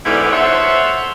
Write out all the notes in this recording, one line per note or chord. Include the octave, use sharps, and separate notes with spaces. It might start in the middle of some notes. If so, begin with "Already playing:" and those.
G#2 B2 D3 G3 B3 E4
F4 A4 C5 C#5 E5 F#5